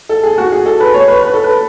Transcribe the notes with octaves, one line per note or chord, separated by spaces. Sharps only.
A4
G#4
F#4
G#4
A4
B4
C#5
B4
B4
A4
B4